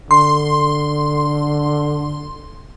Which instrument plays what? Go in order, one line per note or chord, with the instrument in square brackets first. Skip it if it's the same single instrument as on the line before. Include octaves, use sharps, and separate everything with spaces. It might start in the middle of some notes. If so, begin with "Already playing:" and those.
[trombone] D3 [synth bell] C6